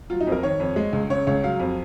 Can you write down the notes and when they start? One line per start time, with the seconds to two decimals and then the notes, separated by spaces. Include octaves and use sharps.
0.10 F#3 F4
0.21 D#4
0.27 F2
0.32 A#4
0.43 D#3 C#5
0.60 F2
0.76 G#3
0.93 C#2
1.10 C#3 C#5
1.27 C#2 C#5
1.44 F#3 F5
1.60 F2